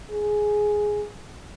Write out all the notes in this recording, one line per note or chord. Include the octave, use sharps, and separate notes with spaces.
G#4